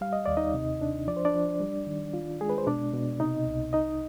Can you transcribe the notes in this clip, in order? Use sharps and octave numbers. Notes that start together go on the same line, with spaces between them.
G3 F5
D#5
D#2 D5
D#4 D#5
C3
D4
F3 D5
C5
D4 D5
F3
G3
D#3
F4
G#3 G#4
B4
C5
B2 D4 D5
B2
C3 D#4 D#5
C2
D#4 D#5